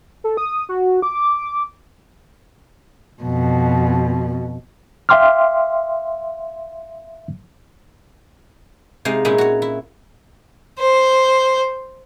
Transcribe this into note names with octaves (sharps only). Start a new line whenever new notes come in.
A4
D#6
F#4
D6
F2 B2
E5 F5 G5 C6 D6 F6
C3 G#3 D#4 F5
A#2 G#3 C#4 D#4 E4
F#4 C#5
E4
C5